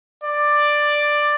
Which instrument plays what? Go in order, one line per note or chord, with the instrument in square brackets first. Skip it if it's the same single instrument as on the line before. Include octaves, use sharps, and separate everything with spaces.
[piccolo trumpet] D5